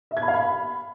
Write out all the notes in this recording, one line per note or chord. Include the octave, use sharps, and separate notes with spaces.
E5
G#6
B5
F5
B5